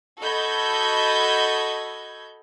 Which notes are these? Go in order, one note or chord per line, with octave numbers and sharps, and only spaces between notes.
F#4 A4 D#5 B5 G6 G#6